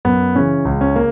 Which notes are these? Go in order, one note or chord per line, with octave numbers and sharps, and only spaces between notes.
F#2 B3
C#3 E3 C#4
C#2
C#4
C#3 A#3